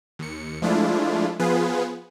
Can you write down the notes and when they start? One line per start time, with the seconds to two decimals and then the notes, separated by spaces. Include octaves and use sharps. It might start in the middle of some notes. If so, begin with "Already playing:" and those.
0.19 D#2 C#7
0.62 F3 G#3 A3 D4 E4 F4
1.39 F3 B3 F4 G#4 B4